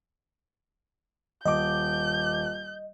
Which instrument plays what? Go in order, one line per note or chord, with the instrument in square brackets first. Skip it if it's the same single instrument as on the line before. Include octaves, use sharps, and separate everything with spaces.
[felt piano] D#1 D6 [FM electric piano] D#5 [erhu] G6